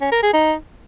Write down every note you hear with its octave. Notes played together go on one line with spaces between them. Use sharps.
C#4
A#4
G#4
D#4